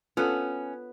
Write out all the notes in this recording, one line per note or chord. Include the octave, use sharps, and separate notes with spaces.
B3 C#4 F4 A4 B4 F#5